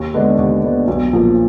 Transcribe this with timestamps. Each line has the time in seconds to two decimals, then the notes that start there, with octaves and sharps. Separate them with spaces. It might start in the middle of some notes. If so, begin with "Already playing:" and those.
Already playing: D#2
0.14 D3 G#3 B3 D4
0.38 D#2
0.63 D3 G#3 B3 D4
0.87 B1
1.12 A#2 F3 A#3